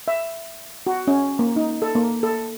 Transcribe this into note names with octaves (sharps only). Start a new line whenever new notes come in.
E5
F#4
C#4
A#3
D#4
A4
A#3
A4